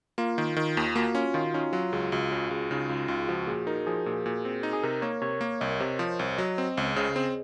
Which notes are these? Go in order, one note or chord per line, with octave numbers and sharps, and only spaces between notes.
A#3 F4
D#3
D#3
D#2
A#3 F#4
C#4 F4
D#3 F4
C#4 D#4
F#3 F4
C#2 G#4
C#2 F#4
C#3 F4
C#2 G#4
C#3 D#4
C#2 F4
C#2 F4
F3 F#4
A#2 G#4
D#4 A#4
F3 G#4
A#2
A#2
C4
D#4
G#4
C3 A#4
A#3 C#5
C3 C#5
A#3
C2 D#5
C3 C5
F3 C5
C2
F#3 D#5
C4 D#5
C#2 C#5
C#3 C5
C4 G#4